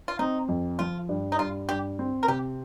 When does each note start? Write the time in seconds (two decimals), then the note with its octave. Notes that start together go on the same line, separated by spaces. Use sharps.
0.08 F4
0.19 C4 D#4
0.49 F2
0.79 F3 F4
1.09 G2
1.32 D#4
1.39 G2 F4
1.69 G2 G4
1.99 C4
2.23 A#4
2.28 C3 G4